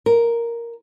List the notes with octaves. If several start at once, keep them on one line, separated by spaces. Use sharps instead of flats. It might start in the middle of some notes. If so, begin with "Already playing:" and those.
A#4